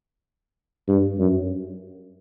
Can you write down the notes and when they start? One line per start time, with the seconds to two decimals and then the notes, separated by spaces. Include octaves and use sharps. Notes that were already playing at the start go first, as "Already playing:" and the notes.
0.88 G2
1.19 F#2